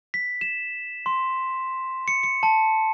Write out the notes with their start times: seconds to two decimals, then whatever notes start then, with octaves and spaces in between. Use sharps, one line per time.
0.14 B6
0.41 E7
1.06 C6
2.08 C#7
2.23 C#7
2.43 A5